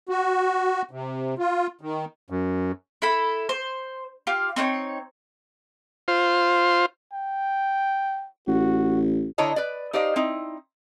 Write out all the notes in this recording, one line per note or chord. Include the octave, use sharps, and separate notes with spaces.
F#4
C3
F4
D#3
F#2
E4 A4 B5
C5
F4 G4 F5
C4 D#4 B4 C#5
F4 C5
G5
A1 F#4
D3 E4 C#5 D#5 A5 A#5
B4 D5
D#4 G4 C5 D5 D#5 F5
C4 D#4 E4